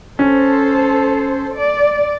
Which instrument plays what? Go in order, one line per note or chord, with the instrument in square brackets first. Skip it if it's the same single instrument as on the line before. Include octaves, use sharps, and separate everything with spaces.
[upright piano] C#4 [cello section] A4 C5
[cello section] D5